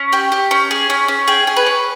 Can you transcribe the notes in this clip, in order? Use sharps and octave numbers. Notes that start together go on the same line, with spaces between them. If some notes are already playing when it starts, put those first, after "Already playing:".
Already playing: C#4
G4 G5
G4
C#4
G#4
C#4
C#4
G#4 G5
G#4
B4
C#4